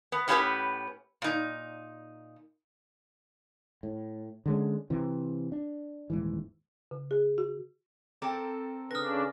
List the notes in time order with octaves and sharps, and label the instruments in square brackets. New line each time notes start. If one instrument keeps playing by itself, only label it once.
[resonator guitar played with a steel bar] B3
A2 B3 C#4 E4 G4 B4
A#2 D#4
[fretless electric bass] A2
D3 G#3 C#4
C3 E3
D4
D#1 G#2 E3
[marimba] C#3
G#4
F#4
[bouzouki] C4 A4 A#4 [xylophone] G5 D6 [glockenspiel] A#5
[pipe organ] C#3 D4 [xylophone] B4 D#6 [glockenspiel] F6 A#6